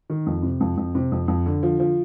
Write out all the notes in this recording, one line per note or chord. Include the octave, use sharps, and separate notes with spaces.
D#3
F2
C3
F2
F2
C3
F2
F2
D3
F3
F3